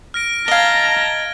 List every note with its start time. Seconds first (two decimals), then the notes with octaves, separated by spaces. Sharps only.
0.14 F6 A#6 D7
0.48 D#5 F5 A5 A#5 G#6 G7